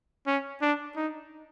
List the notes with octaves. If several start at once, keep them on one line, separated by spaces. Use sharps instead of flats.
C#4
D4
D#4